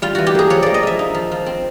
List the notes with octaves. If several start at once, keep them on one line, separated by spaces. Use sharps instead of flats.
G3 F4
E3 F#4
G4
A#3 G#4
F3 C#5
A#3 D5
D#5
F3 E5
D#4
F3
F3
C4